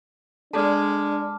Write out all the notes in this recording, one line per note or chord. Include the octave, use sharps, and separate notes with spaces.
G#3 D4 A4 D5 A5 D6 F6